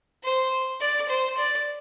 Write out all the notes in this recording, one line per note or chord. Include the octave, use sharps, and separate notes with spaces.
C5
D5
C5
D5